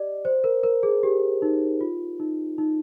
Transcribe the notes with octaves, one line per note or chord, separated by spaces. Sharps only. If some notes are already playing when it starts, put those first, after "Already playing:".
Already playing: G4 D5 D#5
C5
A#4
A#4
G#4
G4
D#4
F4
D#4
D#4